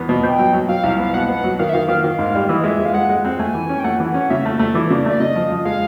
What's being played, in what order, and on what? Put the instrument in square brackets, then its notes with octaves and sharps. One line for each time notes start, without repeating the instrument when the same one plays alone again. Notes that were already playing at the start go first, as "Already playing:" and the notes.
Already playing: [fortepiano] E2 B3
B2
[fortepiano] B2 [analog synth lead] G5
[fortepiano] F#3
F#3
[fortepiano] F#3 [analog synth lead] F5
[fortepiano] C2
B3
[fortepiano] B2 [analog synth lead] F#5
[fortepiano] B3
F#3
[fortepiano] D#3 [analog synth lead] F5
[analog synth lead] E5
[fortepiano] D#3 [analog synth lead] F5
[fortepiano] D#3 [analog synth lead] F5
[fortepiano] D#3
G#2
G3
[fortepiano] E3 [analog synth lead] E5
[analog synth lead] D#5
[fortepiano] G#3 [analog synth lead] E5
[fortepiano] G#3
[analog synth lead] F5
[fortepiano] G#3 [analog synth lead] F#5
[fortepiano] G#3
C4
[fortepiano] A3 [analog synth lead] G#5
[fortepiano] E3
C#4
[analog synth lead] G5
[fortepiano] A3 [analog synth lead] F#5
[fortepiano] E3
C#4
[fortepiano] C#3 [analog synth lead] E5
[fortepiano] A3
A3
[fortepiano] E3 [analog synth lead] D5
[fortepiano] C#3
[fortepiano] A3 [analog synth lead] D5
[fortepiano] C#3 [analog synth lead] D#5
[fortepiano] F3
F3
[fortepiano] G#3 [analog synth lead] F5